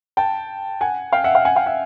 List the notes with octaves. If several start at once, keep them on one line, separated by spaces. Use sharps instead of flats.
G5 A5
F#5 G#5
F5 G5
E5 F#5
F5 G5
F#5 G#5
F5 G5
E5 F#5